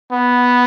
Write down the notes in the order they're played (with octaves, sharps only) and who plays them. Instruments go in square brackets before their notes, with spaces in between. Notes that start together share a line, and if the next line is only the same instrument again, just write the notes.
[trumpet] B3